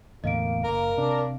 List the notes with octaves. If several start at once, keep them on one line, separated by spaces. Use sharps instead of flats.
E2 A2 D3 A#3 D#5 F5 D7
F#1 A#3 A#4
C3 D4